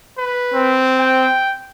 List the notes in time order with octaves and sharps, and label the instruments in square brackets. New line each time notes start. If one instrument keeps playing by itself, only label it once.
[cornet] B4
[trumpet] C4
[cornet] G5